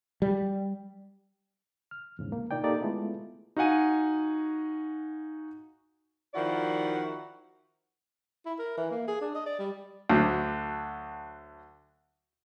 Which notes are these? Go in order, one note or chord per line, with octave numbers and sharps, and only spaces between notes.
G3
F6
E2 G#2 C#3
A#3
A#2 A#3 D#4 D5 G5
A#3 D#4 G4 A4 D5
G#3 A3 B3 E4 F4 A4
D#4 F#4 F5 F#5 G#5 D#7
D#3 F3 E4 F#4 D5 F#5
E4
A#4
E3
A#3
G#4
D4
D#5
D5
G3
D2 D3 F#3